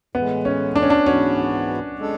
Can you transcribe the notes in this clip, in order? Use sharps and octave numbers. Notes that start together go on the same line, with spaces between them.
A2 E3 G#3 B3
C#4
D4
C#4
D4
G#2 E3 B3 C#4 F#4
G#3 D4 A4